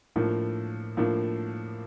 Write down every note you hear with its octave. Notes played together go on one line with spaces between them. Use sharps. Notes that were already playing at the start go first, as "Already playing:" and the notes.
A2 F3 A#3 D4
A2 F3 A#3 D4